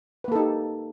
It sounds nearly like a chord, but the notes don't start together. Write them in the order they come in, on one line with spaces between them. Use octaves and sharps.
B4 A#3 A4 D#4 G4